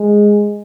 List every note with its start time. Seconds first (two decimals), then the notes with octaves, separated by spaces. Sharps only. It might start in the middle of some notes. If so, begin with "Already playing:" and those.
Already playing: G#3